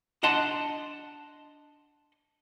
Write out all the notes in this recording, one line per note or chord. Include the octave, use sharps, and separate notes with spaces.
D4 D#5 F#5 A5 C6